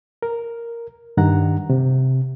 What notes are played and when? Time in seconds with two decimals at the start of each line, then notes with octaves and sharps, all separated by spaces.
0.22 A#4
1.17 G2 D#3 F#5 A#5
1.70 C3